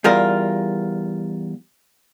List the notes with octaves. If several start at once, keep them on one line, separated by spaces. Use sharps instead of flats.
E2 G3 F4 A#4